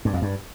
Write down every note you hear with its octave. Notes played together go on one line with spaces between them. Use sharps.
G2
F2
G2